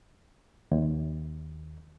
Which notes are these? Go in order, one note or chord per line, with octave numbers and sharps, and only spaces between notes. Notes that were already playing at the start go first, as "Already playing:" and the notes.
D#2